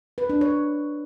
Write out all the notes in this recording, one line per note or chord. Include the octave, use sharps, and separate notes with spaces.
B4
D4
C#5